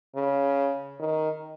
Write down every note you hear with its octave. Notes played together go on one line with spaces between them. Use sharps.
C#3
D#3